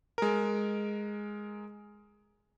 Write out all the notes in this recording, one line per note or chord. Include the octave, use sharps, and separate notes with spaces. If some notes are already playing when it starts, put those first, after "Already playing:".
G#3 A#4